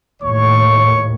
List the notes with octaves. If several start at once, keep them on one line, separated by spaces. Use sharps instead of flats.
D#2 A2 C#5 C#6